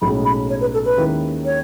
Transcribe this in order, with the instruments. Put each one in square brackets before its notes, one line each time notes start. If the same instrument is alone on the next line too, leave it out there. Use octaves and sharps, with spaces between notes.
[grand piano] B1 A2 G#3 C#4 [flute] B5
[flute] B5
C#5
B4
A4
B4
[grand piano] D#2 D#3 G#3 C#4 E4
[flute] C#5